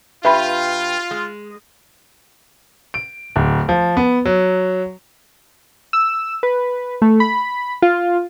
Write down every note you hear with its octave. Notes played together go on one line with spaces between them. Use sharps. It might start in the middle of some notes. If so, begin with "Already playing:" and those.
G2 F4 G4 B4 E5 B5
G#3
D7
D1
F3
B3
F#3
E6
B4
A3
B5
F4